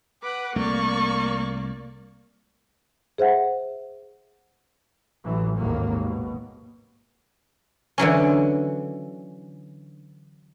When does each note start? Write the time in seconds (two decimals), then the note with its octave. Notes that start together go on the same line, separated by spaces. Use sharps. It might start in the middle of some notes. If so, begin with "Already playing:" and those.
0.23 B4 F#5 D6
0.56 C2 A3 A#3 D5 C#6
3.18 G#4 C5 E5 F#5
5.24 A1 E3 F#3
5.57 G#1 D#2 A2 F#3 A#3
6.03 B2
7.98 D3 E3 F#3 C#4